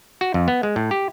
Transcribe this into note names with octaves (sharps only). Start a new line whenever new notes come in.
F#4
F2
B3
G#3
A2
G4